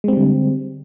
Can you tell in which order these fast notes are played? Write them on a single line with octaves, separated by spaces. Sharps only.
G#3 C4 G3 D3